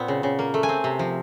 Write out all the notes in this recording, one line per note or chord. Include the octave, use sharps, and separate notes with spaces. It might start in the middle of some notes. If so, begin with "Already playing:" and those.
Already playing: A#2 B3 C4
C#3
C#3
A#3
A3
G#5
C4
C3
F3